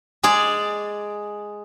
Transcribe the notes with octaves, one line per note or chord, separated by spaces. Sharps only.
G#3 G#4 D5